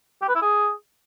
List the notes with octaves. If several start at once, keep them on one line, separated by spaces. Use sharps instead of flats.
G4
B4
E4
G#4